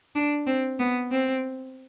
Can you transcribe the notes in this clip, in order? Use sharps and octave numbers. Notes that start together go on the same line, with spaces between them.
D4
C4
B3
C4